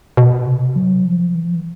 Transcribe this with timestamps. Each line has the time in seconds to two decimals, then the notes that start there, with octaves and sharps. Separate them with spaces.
0.17 B2
0.46 C3
0.76 F#3
1.05 F3
1.35 E3
1.45 F3
1.55 E3